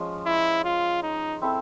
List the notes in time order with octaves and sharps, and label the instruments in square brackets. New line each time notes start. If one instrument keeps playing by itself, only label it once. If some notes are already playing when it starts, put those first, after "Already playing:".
Already playing: [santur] F3 G#3 C#4
[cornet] E4
F4
D#4
[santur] C4 E4 A4